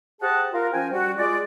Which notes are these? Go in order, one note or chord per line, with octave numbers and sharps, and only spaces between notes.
G4 G#4 C5 D#5 F#5 A5
F4 A#4
F3 C#4 C5 G5 G#5
G3 F#4
G#3 F4 G#4 D5